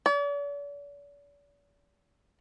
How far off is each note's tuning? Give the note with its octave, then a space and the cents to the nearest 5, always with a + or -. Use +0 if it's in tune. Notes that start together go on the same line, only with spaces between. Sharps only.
D5 -45